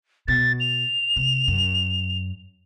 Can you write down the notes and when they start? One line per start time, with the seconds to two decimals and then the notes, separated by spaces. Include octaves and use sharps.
0.28 B2 A6
0.60 F7
1.16 C3
1.48 F#2